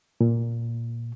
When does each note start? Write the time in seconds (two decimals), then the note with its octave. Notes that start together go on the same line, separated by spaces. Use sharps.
0.21 A#2